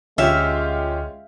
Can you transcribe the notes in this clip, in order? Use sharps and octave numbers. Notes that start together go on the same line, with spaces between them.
D2 G#3 C#4 F4 G4 E5 F5